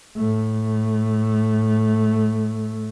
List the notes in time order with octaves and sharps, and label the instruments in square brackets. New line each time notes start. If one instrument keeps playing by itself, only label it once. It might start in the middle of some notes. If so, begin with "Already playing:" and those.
[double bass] A2 A3